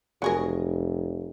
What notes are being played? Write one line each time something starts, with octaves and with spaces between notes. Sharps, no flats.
F1 F#3 G#4 A#4